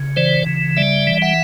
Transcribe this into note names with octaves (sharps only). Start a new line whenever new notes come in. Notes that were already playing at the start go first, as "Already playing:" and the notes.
Already playing: C#3
E3 C5 D5
C#3
G3 D5 E5
E3
E5 F#5